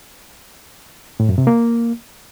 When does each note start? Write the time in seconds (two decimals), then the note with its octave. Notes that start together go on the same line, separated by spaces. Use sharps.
1.20 A2
1.29 F#2
1.38 C3
1.47 A#3